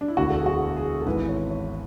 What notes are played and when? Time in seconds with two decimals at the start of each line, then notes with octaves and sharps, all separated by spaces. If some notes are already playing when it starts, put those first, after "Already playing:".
0.01 D4
0.08 E4
0.17 E1 D2 D3 F#4
0.30 A4
0.38 G#4
0.46 F#4
0.77 G#4
1.01 A4
1.06 G#1 G#2 E3 B4
1.29 C#5
1.50 C#5